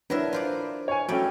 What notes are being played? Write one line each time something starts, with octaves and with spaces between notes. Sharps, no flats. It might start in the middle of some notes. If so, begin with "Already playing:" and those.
F#3 D4 E4 A#4 B4 E5
F4 C5 D5
C#5 G#5
F#3 G3 A3 C#4 D5 G5